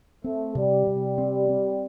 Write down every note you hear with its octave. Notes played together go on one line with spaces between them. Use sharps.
A3 C4
C3 G3
C3
C4
C4